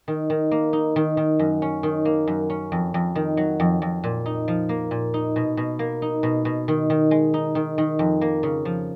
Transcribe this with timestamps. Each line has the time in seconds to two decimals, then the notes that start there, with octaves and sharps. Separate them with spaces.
0.08 D#3
0.30 D#3
0.51 A#3
0.73 D#4
0.96 D#3
1.17 D#3
1.39 F#2
1.62 C#4
1.83 D#3
2.05 A#3
2.27 F#2
2.50 C#4
2.72 F2
2.94 F2
3.15 D#3
3.37 F#3
3.60 F2
3.82 F2
4.04 A#2
4.26 D#4
4.48 F3
4.69 A#3
4.91 A#2
5.14 D#4
5.36 B2
5.57 B2
5.79 A#3
6.02 D#4
6.23 B2
6.45 B2
6.68 D#3
6.90 D#3
7.11 G#3
7.34 D#4
7.55 D#3
7.78 D#3
7.99 F2
8.21 A#3
8.43 C#3
8.65 F3